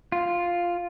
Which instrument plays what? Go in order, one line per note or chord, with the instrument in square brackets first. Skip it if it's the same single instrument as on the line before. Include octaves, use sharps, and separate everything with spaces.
[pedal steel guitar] F4